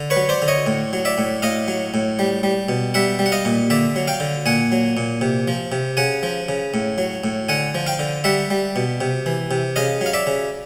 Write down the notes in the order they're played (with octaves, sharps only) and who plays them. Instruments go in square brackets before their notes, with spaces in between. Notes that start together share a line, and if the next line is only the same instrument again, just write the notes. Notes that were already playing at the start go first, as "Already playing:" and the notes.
Already playing: [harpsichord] D3
B4 C#5
F#3
C5 D5
D3
C#5 D#5
A2
F#3
D5 E5
A2
A2 D#5 F5
F#3
A2
G3
G3
B2
G3 E5 F#5
G3
F#5
D#5 F5
A#2
D3 D5 E5
F#3
F5 G5
D3
A#2 F#5 G#5
F#3
A#2
C3
F3
C3
C#3 F#5 G#5
F3
C#3
A2
F#3
A2
D3 F#5 G#5
F3
F5 G5
D3
G3 E5 F#5
G3
B2
C3
E3
C3
C#3 D#5 F5
F#3
F5
D5 E5
C#3